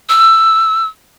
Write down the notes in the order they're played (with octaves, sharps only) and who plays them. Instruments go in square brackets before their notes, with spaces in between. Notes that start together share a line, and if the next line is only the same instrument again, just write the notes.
[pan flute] E6